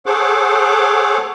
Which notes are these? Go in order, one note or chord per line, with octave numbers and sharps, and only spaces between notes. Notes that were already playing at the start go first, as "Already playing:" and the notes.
G#4 A4 C5 C#5 F#5 D6